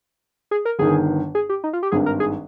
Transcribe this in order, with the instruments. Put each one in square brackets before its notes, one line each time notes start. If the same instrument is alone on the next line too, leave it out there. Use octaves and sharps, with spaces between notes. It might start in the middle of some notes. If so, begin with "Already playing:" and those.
[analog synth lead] G#4
A#4
[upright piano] G1 G2 D#3 [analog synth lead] G#4
[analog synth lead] G#4
G4
D#4
F4
G4
[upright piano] G#1 G2 D#3 [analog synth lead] G#4
[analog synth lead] A#4
G#4